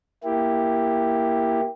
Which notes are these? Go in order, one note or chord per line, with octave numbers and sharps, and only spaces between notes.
A#3 E4 G4